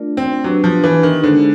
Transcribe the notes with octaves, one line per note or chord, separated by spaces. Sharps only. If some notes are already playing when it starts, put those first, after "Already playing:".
Already playing: A3 D4 F4 A#4 D5
C4
F#3 B3 D4 G4 B4
F3
E3
D#3
D3 G#3 B3 D#4 G#4 C5